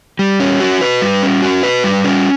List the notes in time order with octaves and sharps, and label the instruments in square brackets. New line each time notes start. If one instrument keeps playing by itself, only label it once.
[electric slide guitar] G3
C#4
F#4
B4
G3
C#4
F#4
B4
G3
C#4